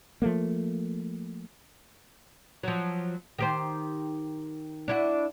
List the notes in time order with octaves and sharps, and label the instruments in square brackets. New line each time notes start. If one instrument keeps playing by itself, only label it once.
[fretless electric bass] F3 A3 A#3
[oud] F3 F#3
D#3 G4 C5
D4 E4 F#4